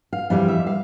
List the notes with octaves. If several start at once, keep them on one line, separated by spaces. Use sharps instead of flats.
F5
F2 E3 G3 F5
E5
F5